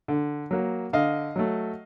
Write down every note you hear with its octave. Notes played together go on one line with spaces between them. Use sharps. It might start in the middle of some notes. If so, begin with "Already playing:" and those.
D3
F#3 A#3
D3 D#5 F5
F#3 A3